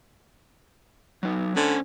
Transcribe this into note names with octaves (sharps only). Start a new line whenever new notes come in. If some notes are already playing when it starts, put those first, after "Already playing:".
F#3 D#4
D3 C#4 C5 G#5